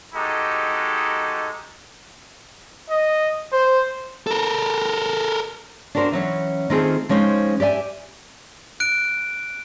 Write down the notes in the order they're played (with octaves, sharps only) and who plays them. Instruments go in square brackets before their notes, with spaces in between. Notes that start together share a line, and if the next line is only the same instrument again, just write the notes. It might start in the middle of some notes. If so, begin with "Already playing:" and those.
[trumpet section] G#3 D#4 F#4 G4 A4
[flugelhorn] D#5
C5
[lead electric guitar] A4 A#4
[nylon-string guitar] D4 F#4 G4 A#4 C5
E3 F#3 C#4
D#3 A3 C4 F4 G#4
F3 G#3 C#4 D#4 C5
G4 D5 E5 G#5
[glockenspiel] F#6 D7